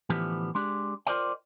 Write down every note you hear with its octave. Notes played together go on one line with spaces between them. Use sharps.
A2 D3 E3 F3 B3 G4
G#3 D4 G4
F4 A#4 C5 D5 D#5 G5